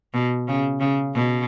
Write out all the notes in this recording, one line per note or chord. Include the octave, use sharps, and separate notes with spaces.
B2
C#3
C#3
B2